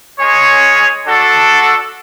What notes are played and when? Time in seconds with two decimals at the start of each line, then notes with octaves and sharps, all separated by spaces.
0.19 G#3 C#4 G#4 C#5
1.05 D4 F#4 A4